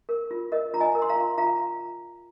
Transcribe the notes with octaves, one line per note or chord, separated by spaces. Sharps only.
A#4
F4
A#4 D#5
F4 A#5
D#5 G#5
A#4
C6
F5 A#5
F4
F4 F5 A#5